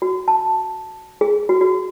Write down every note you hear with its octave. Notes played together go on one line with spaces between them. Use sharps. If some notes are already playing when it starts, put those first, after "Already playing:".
F#4
A5
G#4
F#4
F#4